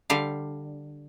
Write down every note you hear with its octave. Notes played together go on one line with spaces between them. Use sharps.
D3 G3 F5